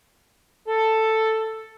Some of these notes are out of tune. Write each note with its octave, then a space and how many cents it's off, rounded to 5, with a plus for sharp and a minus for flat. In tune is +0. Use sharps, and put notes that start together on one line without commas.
A4 +5